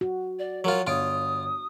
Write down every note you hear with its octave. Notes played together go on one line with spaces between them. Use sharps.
F#4
D5
F#3 F4 A#4
G1 F4 C#5 D#6 D7